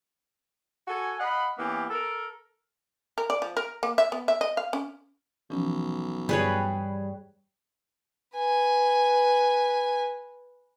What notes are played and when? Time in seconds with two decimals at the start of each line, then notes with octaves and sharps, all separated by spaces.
0.88 F#4 A4 G#5
1.20 D#5 F5 F#5 B5
1.58 E3 A#3 B3 C#4 G4
1.90 A4 A#4
3.18 A#4
3.30 D5
3.42 F3
3.57 A#4
3.83 A#3
3.98 E5
4.12 B3
4.28 E5
4.41 D#5
4.57 F5
4.73 C#4
5.50 B1 E3 F3 C#4
6.29 G2 G3 G#4 B4 C#5
8.37 B4 G#5